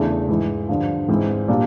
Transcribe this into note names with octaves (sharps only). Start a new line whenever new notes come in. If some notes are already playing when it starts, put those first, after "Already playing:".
Already playing: E2 C#3 E3 A3 D4
G#2 E3 G#3
G2 D3 F3
G#2 E3 G#3 C4
A#2 G3 A#3 D4